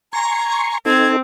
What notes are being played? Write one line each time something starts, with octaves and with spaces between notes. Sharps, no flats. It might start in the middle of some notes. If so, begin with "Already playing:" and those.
G#5 A#5 C6 C#6
C4 D#4 A4 G#6